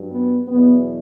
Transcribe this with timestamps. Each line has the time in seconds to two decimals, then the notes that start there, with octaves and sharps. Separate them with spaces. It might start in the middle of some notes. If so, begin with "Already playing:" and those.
Already playing: G2 F#3
0.12 B3
0.48 E2 B2 F#3 B3